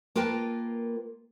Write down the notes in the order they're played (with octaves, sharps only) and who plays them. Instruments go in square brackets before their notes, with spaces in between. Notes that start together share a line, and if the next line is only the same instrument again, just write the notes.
[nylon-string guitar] A#3 F4 A#4 B4 G5 A5